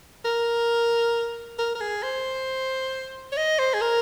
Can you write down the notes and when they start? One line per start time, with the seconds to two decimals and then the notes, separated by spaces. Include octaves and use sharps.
0.25 A#4
1.59 A#4
1.75 A#4
1.81 G#4
2.03 C5
3.32 C#5
3.37 D#5
3.59 C5
3.74 G#4
3.81 A#4